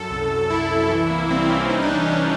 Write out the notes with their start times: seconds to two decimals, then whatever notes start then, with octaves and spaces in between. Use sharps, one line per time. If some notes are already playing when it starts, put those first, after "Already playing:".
Already playing: F#2 A4
0.10 C2
0.30 C2
0.50 C2 E4
0.70 C2
0.90 E3
1.10 A#3
1.30 G3 C4
1.50 G3 C#4
1.69 E3 D#4
1.82 D4
1.90 C2 C#4
2.05 E3 D4